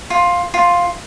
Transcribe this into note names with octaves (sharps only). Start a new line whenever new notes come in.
F4
F4